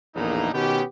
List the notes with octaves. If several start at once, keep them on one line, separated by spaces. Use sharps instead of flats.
A#1 E2 A2 D3 A#3 D#4
B2 D#3 B3 C#4 G4